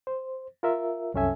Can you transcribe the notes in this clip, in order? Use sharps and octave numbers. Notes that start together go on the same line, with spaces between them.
C5
F4 A#4 E5
C2 F#2 C#4 A4 E5 G#5